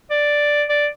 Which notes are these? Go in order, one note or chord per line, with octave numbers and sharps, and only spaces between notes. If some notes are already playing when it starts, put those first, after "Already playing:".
D5
D5